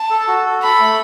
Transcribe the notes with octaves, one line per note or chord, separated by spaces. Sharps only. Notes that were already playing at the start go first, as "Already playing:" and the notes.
Already playing: A5
A4
F#4
A4
A4 B5
A3